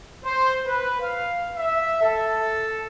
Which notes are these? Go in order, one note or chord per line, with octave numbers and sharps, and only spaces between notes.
C5
B4
F5
E5
A4